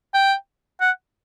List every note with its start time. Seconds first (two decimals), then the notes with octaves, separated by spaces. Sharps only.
0.14 G5
0.81 F#5